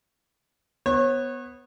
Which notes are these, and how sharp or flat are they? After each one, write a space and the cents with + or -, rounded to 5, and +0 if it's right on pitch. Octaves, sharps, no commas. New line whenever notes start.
B3 +0 C#5 -35